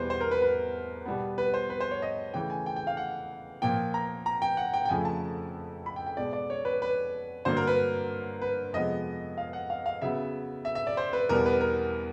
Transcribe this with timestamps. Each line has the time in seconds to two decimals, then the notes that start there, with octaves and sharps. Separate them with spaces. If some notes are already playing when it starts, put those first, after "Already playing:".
Already playing: E2 B2 G3 B4 C5
0.10 C5
0.21 A#4
0.31 B4
0.42 B4
1.06 B2 G3 B3
1.38 B4
1.54 C5
1.70 B4
1.80 C5
1.91 C#5
2.02 D#5
2.34 C#3 E3 A3 G5
2.50 G#5
2.66 G5
2.76 G5
2.87 F5
2.97 F#5
3.62 A#2 F3 A#3 G5
3.94 A#5
4.26 A#5
4.42 G5
4.57 F#5
4.74 G5
4.85 G5
4.89 F2 C#3 F3 A3 G#5
5.05 A5
5.86 B5
5.96 G5
6.06 G5
6.17 B2 G#3 B3 D5
6.33 D5
6.50 C#5
6.65 B4
6.82 B4
7.45 G2 D3 F#3 A#3 C5
7.57 A#4
7.67 B4
8.42 B4
8.73 F2 C3 F3 G#3 B3 D#5
9.38 F5
9.53 F#5
9.70 F5
9.86 F5
10.02 C#3 F#3 B3 E5
10.65 E5
10.75 E5
10.87 D5
10.97 C5
11.13 B4
11.29 E2 B2 G3 B3 A#4
11.46 B4
11.61 A#4